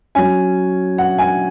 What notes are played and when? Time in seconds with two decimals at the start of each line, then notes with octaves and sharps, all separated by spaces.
0.15 F#3 C#4 G#5
0.98 F#5
1.18 G#5